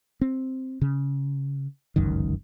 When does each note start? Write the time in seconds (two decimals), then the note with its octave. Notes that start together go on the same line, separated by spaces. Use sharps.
0.21 C4
0.82 C#3
1.96 G1 C#2 F#2 D#3